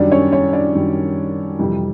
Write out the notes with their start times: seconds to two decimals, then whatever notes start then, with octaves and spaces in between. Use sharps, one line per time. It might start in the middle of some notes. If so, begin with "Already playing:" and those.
Already playing: F#2 D#3 G3 D4 D5
0.12 C#4 C#5
0.32 C#4 C#5
0.53 D4 D5
0.75 F#2 D#3 G3
1.59 F2 C3 E3 G3